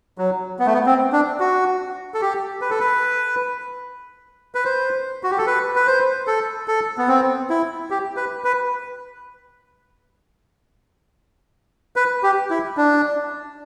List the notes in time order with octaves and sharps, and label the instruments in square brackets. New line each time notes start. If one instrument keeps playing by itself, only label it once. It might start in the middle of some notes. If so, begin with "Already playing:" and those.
[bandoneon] F#3
B3
A3
B3
C4
D4
F#4
A4
G4
B4
A4
B4
B4
C5
F#4
G4
A4
B4
B4
C5
A4
A4
B3
C4
E4
G4
B4
B4
B4
G4
E4
D4